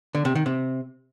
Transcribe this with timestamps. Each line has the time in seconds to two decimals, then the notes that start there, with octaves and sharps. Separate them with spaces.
0.15 D3
0.25 C3
0.35 D#3
0.46 C3